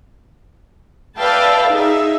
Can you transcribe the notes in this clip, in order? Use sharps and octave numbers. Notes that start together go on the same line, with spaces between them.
B4 D5 E5 F5 G5 A5
D#4 G#4 E5